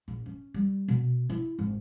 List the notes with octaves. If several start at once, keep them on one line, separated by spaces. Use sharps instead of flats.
A#1
C#4
G3
B2
E4
G#1